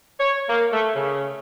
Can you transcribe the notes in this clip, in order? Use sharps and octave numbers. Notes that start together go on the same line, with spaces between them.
C#5
A#3
A3
C#3